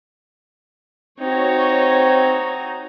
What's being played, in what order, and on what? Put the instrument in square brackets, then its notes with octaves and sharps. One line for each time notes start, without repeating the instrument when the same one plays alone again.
[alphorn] C4 [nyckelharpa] D#4 F#4 [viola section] C#5